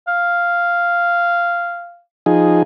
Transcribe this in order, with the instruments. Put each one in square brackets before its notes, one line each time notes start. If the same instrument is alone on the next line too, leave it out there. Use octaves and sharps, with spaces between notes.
[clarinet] F5
[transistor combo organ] F3 D#4 G#4